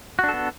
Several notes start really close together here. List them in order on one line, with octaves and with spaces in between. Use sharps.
F#4 D4 A4 B3